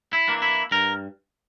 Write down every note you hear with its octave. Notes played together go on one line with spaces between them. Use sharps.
E4
E3 A#3 D4
E4
G2 A#4